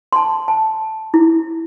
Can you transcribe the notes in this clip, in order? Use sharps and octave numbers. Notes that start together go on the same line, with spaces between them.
A5 C6
A5
E4